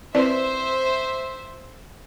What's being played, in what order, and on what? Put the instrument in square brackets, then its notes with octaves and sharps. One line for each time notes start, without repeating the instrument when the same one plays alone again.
[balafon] C4 E4 B4 D5 [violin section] C5 E5